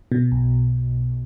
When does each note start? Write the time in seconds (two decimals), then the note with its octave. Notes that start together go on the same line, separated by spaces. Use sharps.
0.12 B2
0.32 B1